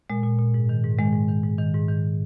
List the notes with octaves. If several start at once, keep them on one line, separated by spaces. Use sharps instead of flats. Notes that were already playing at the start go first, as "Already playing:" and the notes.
A#2 G#3
A#2
A#2
G#2
D#3
G#2
D#3 G#3
G#2
D#3
G#2
D#3
G#2
D#3